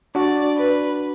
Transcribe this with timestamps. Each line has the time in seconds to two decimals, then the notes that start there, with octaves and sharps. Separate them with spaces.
0.15 D4 F#4 D5
0.56 B4